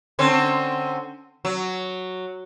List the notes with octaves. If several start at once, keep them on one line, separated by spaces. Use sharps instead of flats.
D3 C4 C#4
F#3